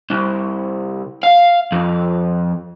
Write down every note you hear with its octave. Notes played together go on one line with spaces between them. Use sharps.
C2
F5
F2